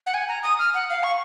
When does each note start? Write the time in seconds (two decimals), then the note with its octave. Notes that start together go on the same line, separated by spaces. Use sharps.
0.06 F#5
0.14 G#5
0.28 A#5
0.43 D#6
0.59 F6
0.74 F#5
0.90 F5
1.03 C#6